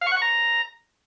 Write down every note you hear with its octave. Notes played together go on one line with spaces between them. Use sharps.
F5
C#6
F#5
C#6
A#5